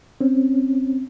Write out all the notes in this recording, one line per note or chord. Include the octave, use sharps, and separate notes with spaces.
C4 C#4